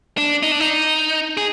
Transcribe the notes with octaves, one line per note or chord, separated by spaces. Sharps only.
D4
D#4
D4
D#4
G#4